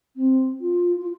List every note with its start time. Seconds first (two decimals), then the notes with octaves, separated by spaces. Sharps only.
0.16 C4
0.61 F4
1.01 F4